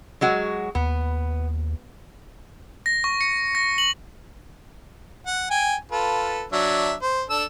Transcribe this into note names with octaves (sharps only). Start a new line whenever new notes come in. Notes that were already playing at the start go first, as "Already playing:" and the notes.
F#3 G#3 F#4
D#2 B3
A#6
C#6
C#7
A#6
F#7
F#5
G5 G#5
F4 A4 B4
F#3 D4 E5
C5
D4 A4 E6